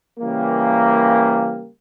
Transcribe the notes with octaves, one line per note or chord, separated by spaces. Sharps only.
C#3 E3 G3 A#3